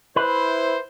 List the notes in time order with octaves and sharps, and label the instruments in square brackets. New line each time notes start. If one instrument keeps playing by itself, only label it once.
[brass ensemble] E4 C5 [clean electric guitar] B4